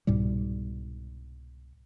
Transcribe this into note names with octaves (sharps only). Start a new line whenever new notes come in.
C2 G#2 B2 G3